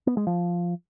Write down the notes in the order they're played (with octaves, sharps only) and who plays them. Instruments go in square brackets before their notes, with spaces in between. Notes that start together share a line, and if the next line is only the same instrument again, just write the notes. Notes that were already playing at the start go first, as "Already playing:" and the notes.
[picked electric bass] B3
G#3
F3